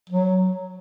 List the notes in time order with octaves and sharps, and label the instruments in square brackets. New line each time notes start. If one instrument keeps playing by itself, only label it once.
[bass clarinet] F#3